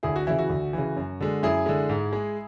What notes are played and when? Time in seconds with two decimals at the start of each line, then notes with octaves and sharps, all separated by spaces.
0.03 D2 E4 G#4
0.16 F#4
0.27 C#3 E3 E4
0.39 F#4
0.50 D2
0.73 C#3 E3
0.96 F#2
1.20 D3 G#3
1.43 F#2 E4 G#4
1.66 D3 G#3
1.89 G#2
2.13 G#3